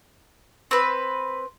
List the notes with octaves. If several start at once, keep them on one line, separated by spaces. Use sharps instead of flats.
C4 B4